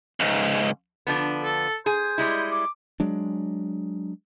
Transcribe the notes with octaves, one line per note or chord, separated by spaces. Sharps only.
C#2 G#2
D3 F3 B3
A4
G#4 C5
G3 G#3 E4
D6
F#3 G#3 D4